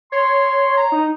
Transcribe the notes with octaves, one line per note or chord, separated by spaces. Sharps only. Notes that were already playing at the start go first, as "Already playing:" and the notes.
C#5 C6
A#5
D#4